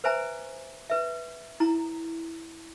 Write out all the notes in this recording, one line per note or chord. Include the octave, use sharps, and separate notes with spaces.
B4 C5 E5 G#5 A#5
B4 E5
E4 A#5